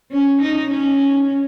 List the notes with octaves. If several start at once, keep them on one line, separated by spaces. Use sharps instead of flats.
C#4
D#4
C#4